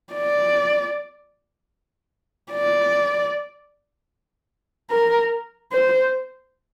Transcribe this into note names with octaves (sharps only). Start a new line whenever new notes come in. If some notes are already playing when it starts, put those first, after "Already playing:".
D5
D5
A#4
C5